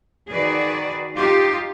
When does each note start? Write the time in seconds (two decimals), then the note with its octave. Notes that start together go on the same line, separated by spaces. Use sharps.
0.29 D#3 F#4 G#4 B4 D5
1.16 D#4 F4 G4